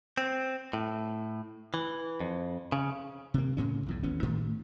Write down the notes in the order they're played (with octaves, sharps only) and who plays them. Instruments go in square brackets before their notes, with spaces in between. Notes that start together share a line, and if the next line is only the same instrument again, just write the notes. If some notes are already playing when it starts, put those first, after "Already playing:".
[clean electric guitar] C4
A2
E3
F2
C#3
[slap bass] C3 A#3
A2 C#3 C#4
B1 E2 A2
A1 D#2 B3 C#4
A2 D#3 A3